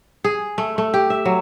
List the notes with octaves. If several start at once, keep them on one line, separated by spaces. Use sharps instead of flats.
G#4
A3
A3
G4
E5
F#3